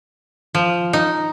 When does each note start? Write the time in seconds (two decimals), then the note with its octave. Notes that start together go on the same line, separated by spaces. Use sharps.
0.55 F3
0.93 D#4